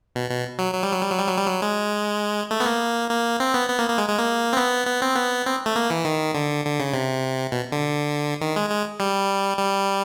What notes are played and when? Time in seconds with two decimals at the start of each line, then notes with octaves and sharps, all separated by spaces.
0.15 B2
0.30 B2
0.59 F#3
0.74 F#3
0.83 G3
0.92 F#3
1.01 G3
1.10 F#3
1.19 G3
1.28 F#3
1.37 G3
1.46 F#3
1.62 G#3
2.51 A3
2.60 B3
2.66 A#3
3.10 A#3
3.40 C4
3.54 B3
3.69 B3
3.79 A#3
3.89 A#3
3.98 G#3
4.08 G#3
4.18 A#3
4.53 C4
4.57 B3
4.87 B3
5.02 C4
5.16 B3
5.46 C4
5.66 A3
5.76 A#3
5.90 E3
6.05 D#3
6.34 D3
6.65 D3
6.80 C#3
6.93 C3
7.52 B2
7.72 D3
8.41 D#3
8.56 G#3
8.70 G#3
9.00 G3
9.58 G3